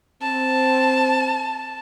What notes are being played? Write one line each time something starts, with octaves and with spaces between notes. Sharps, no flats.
C4 A5